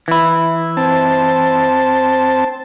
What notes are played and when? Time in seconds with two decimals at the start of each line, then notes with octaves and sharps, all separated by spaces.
0.08 E3 E4
0.77 C4 A5